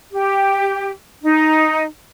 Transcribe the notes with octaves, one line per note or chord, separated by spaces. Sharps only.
G4
D#4